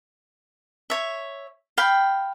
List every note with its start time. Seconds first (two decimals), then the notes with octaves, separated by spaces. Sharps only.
0.90 C#5 E5
1.78 F5 G5 B5